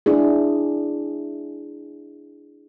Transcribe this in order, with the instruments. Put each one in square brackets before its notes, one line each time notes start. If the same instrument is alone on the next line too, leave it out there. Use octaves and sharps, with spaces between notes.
[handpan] D4 E4 G#4